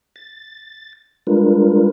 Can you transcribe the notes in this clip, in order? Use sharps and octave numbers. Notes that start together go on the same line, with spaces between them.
A6
G3 G#3 D4 F4 A#4 B4